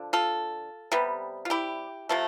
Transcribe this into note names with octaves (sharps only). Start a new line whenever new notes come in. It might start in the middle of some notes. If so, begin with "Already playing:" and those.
Already playing: D3 F3
F4 A4
C3 G3 B3
F4
E4 G4
C3 F3 A3